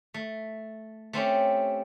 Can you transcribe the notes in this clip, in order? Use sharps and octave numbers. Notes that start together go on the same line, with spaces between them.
A3
A3 C4 C#4 G4